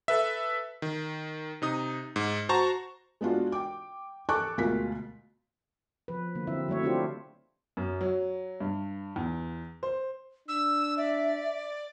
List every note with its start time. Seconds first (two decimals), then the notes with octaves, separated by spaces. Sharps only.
0.08 A4 B4 E5
0.82 D#3
1.62 C3 D#4 D#6
2.16 G#2
2.49 F#4 C5 A5 A#5 C#6
3.21 G#3 B3 D4 F4 F#4
3.52 G5 D6
4.29 A4 A5 C#6 D6 F#6
4.57 D2 B2 G#3 F4 A#4 B6
6.08 F3 B4
6.35 D3 A#3
6.47 F#3 C4 E4 E5
6.69 F#3 A3 C#5 E5
6.83 C4 D4 E4 F4 G4
7.77 F#2
8.01 F#3
8.60 G2
9.16 E2
9.83 C5
10.48 D4 E6
10.97 D5 E5